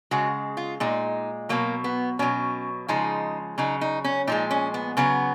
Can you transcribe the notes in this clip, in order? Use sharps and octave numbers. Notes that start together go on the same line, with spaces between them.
C#3 G#3 F#4
F4
A#2 G#3 D#4
B2 F#3 A#3
B3
B2 F#3 C#4
C#3 F3 G#3 D#4
C#3 F#3 D#4
D#4
C#4
A#2 F3 G#3 D#4
C#4
B3
C#3 F#3 B3